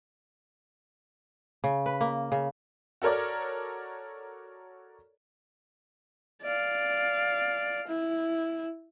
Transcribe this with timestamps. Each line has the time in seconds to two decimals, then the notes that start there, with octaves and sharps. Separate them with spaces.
1.64 C#3
1.86 B4
2.01 A#3
2.32 C#3
3.02 F#4 A4 A#4 C#5 D5
6.43 D5 F5
7.88 E4